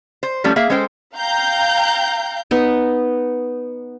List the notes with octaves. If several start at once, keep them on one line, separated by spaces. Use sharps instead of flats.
C5
F3 G3 A3 C#4
A#3 G#4 E5 F5
G#3 C#4 A4 C5 F5 G5
F5 G5 A#5 G6
B3 D#4